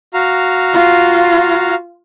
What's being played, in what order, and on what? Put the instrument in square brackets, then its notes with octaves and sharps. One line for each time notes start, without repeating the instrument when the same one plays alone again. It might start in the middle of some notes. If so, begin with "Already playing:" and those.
[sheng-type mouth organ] F#4 F5 A#5
[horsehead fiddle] F4